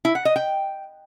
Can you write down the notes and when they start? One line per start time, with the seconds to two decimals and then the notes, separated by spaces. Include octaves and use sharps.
0.05 E4
0.15 F#5
0.25 D#5
0.36 G5